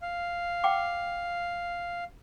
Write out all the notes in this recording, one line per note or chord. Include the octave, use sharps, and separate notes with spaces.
F5
F#5 G5 D6